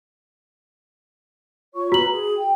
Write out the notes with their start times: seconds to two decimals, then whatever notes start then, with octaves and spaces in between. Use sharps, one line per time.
1.74 F4 C#5 C#6
1.92 F#4 B4 A#5 F#7
2.11 G#4
2.37 G5